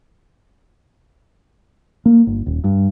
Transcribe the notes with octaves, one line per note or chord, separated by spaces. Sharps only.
A#3
G1
D#1
G2